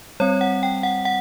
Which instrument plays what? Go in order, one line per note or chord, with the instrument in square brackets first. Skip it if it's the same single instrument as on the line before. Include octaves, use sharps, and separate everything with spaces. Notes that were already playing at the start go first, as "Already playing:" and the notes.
[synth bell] G3 C4 C#5
F#5
G5
F#5
F#5